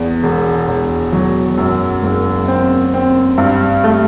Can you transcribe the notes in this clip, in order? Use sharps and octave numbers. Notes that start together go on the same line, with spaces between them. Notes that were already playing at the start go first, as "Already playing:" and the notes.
Already playing: E2
E1
E1
F#3
F#2
F#1
C4
C4
G2
A3